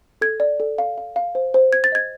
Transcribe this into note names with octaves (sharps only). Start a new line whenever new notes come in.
A4 G#6
D5
A4
F5
F5
F5
C5
C5
C5 G#6
A6
D#5 G#6